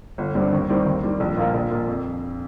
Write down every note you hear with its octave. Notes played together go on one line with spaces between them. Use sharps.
G1
G2 G3 C4
D#2
D#3 G3 C4
D#2
D#3 G3
A#1
A#2 F3 A#3 F4
A#1
A#2 A#3 F4
F2